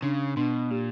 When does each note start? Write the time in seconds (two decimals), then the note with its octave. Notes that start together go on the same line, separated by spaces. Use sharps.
0.02 C#3 D4
0.37 B2 D4
0.70 A#2 G4